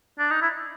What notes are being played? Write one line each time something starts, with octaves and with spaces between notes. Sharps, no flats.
D4
D#4
E4